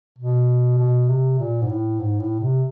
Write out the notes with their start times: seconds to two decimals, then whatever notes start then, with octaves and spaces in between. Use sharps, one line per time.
0.18 B2
0.78 B2
1.09 C3
1.39 A#2
1.62 G#2
1.69 A2
2.00 G#2
2.20 A2
2.40 C3